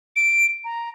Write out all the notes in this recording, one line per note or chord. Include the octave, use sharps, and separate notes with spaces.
D7
A#5